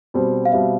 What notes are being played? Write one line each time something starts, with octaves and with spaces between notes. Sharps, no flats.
B2 G3 C4
F5
B2 G3 C4 E5